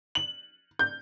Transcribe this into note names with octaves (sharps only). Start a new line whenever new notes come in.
F#7
G6